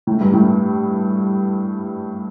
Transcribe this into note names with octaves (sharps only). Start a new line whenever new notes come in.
A2
G2
A2